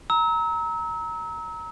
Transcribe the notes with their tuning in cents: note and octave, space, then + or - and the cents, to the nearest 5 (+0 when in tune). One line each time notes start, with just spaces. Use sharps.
A#5 +0 E6 -35